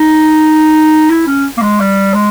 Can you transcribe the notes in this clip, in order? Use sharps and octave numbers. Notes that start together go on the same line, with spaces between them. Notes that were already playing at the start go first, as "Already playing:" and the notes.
Already playing: D#4
E4
C#4
A#3
G#3
G3
G#3